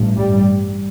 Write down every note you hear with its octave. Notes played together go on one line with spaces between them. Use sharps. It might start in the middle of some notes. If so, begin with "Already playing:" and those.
Already playing: A1 G2
G3